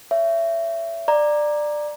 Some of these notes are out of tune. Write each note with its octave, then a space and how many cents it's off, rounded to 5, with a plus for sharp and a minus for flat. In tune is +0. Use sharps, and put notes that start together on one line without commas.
C#5 +25 E5 +20
D5 +15 A#5 +0